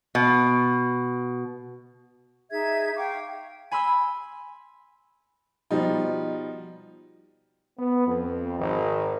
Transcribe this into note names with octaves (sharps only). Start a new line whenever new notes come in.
B2
D#4 G#4 E5 G#6
F5 G5 C#6 D6
G#5 B5 C6 E6
B2 F3 G3 D#4
B3
F2
G#1 D#3